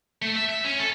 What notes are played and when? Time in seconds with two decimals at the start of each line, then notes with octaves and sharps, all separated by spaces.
0.22 A3
0.36 E5
0.49 E5
0.64 C#4
0.80 A4